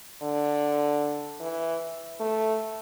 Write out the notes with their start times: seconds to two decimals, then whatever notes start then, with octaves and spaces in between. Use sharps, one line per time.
0.22 D3
1.40 E3
2.20 A3